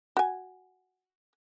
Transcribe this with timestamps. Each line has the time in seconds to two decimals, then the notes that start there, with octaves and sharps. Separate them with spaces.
0.17 F#4 G#5